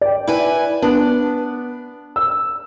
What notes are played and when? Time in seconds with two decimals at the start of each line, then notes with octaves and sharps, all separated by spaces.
0.01 D5 G5
0.27 E4 B4 G#5
0.82 B3 D4
2.16 E6